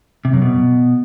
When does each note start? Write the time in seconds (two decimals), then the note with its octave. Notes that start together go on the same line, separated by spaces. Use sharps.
0.25 C3
0.33 F#2
0.42 B2